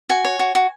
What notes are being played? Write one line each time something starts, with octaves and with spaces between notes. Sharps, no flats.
F#4 G#5
C#5
F#4
F#4